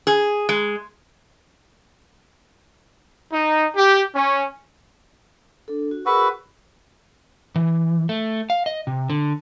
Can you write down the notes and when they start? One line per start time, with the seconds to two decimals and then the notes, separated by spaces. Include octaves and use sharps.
0.07 G#4
0.49 G#3
3.32 D#4
3.75 G4
4.13 C#4
5.68 D4 A4
5.91 F#4
6.06 F#4 G#4 A#4 B4 E6
7.56 E3
8.09 A3
8.50 F5
8.66 D#5
8.87 C3
9.10 D3